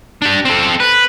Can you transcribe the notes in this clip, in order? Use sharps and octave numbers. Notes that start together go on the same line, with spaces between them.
D4 G4
C4 A4
B4